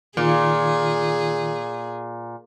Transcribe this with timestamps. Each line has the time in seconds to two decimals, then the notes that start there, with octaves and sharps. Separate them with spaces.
0.17 A#2 D#3 F4 G#4